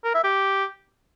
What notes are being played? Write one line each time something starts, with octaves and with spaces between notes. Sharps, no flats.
A#4
E5
G4